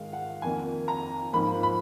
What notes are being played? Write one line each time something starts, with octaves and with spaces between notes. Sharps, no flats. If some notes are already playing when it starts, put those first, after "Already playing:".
Already playing: G#2 D#3 G#3 F5
F#5
F2 D#3 A#3 G#5
A#5
G#2 F3 A#3 B5
B5